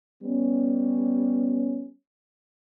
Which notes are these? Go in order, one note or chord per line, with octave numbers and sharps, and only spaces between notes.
G3 B3 C#4